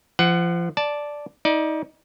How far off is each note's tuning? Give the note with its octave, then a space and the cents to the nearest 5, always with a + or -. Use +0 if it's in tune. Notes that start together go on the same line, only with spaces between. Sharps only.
F3 -25 F#5 +15
D5 +0 A5 -5
D#4 +30 D5 +20